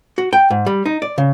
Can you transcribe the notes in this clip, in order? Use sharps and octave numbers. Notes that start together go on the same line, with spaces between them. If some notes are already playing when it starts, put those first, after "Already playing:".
F#4
G5
G#2
G3
D#4
D5
C#3